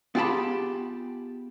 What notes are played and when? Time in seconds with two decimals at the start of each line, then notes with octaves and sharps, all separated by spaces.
0.15 B3 F4 G4 G#4 A5 B5